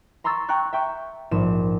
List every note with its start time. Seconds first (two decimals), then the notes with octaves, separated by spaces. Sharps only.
0.24 A#5 C6 C#6 E6 A6
0.49 G5 A#5 C#6 F#6
0.73 E5 G5 C#6
1.31 A#1 G#2 E7